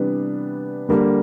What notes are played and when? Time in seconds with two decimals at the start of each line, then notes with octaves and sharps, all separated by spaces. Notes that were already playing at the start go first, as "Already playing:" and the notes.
Already playing: C3 E3 G3 B3 D4
0.89 D3 G3 A#3